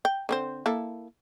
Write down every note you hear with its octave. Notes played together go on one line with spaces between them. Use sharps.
G5
D3 C4 C5
A#3 E4 A4